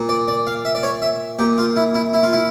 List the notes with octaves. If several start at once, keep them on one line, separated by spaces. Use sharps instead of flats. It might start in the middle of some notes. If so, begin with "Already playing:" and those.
Already playing: A#2
D5
D5
F5
E5
D5
C#5
E5
A#2 G4
F4
E4
E4
E4
F4
E4